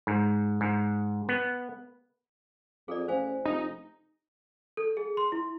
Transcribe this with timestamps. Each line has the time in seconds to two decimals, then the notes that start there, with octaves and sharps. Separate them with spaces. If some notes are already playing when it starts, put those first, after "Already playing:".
0.07 G#2
0.61 G#2
1.29 B3
2.88 F2 G#4 A4 D5
3.08 A1 C5 F5 G#5
3.46 F1 D#4
4.77 A4
4.97 G#4
5.17 C6
5.32 E4